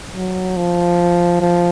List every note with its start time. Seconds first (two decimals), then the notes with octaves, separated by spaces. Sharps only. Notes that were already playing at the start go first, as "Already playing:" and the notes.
0.14 F#3
0.56 F3
1.41 F3